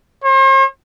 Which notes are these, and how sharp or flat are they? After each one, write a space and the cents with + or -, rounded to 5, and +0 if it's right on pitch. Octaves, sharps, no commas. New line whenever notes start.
C5 +45